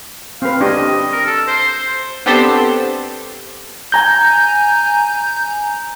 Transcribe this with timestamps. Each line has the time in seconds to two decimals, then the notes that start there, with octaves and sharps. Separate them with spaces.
0.42 C4 B4 F5
0.61 D4 G4 D#5
1.13 A#4
1.26 A4
1.48 C5
2.26 B3 C4 D4 G4 A4 C5
3.92 G#5 A#5 G6